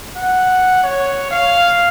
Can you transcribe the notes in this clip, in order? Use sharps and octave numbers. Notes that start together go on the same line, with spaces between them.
F#5
C#5
F5